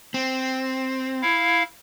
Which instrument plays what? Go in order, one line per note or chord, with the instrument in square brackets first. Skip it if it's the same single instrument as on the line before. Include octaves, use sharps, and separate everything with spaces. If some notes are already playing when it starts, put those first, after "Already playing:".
[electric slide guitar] C4
[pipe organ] E4 F5